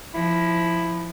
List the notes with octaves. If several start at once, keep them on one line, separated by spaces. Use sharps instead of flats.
F3 E4